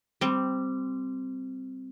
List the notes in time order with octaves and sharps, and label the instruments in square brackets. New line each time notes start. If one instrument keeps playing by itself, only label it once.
[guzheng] G3 C4